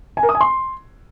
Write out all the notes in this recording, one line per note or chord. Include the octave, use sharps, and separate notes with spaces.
G#5
A#4
D#6
G#5
C6